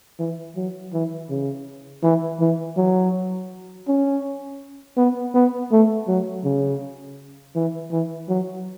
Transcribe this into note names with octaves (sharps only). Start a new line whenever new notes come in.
E3
F#3
E3
C#3
E3
E3
F#3
C#4
B3
B3
A3
F#3
C#3
E3
E3
F#3